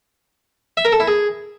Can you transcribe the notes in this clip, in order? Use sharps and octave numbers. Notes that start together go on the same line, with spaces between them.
E5
A#4
A4
E4
G#4